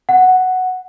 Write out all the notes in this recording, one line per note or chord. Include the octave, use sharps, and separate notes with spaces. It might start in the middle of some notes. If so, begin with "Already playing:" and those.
F#5